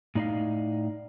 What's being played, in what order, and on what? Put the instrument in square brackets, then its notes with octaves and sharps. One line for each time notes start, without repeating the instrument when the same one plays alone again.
[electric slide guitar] A2 D#4 D5 D#5 F5